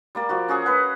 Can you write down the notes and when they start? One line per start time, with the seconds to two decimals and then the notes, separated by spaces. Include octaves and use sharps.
0.15 G3 A#3 D5
0.29 F3 F#4
0.48 C#4 F#4 G#4 F#5
0.66 B4 F#5